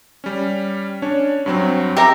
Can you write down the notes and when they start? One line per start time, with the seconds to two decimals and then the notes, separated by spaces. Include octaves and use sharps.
0.24 G3 C#4
1.02 C#4 D4 C#5
1.46 G2 F#3 C4
1.97 G4 E5 A#5